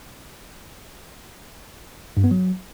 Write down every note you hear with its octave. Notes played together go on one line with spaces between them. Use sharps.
G2
B3
F#3